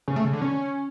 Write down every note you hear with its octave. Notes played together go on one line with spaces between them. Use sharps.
C#3
A3
C#3
D3
C#4